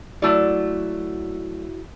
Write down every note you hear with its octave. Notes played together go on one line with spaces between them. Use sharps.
F#3 A3 E4 F#4 D5